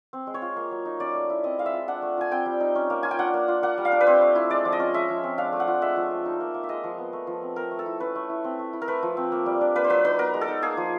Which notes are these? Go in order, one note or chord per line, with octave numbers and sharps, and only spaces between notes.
C4
G#3
C#5
F4
A#3
F#3
D#4
C#4 D5
A3
E4
C4 D#5
G#3 F5
E5
F4
D4 F#5
A3
F4 G#5
C4 G5
G3
D#4
C#4
A#3
F4 G#5
G5
D4 F#5
A#3
F4
A#3 F#5
G3
F5
D4
B4
C4 C5
A3
E4
G#3 D5
F3
D#5
C#4
G#3 E5
F3
C4
D4 F5
A3
F#5
F4
G#3 E5
F3
C4
D#4
A#3
A#3
E5
G#3 D#5
F3
B3
A3
F3
C4
C4 A#4
A3
A4
E4
C#4 B4
A3
E4
C4
A3
E4
A#4
A3 B4
F3
C4
A#3
G3
D4
A#3 B4
C5
F#3 B4
D#4 B4
B3 A#4
G#3
A4
D#4
A#3 G#4
F3